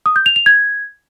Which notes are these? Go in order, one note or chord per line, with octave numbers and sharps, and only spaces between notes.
D#6
G6
F7
F7
G#6